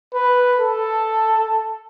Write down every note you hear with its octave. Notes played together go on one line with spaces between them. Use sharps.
B4
A4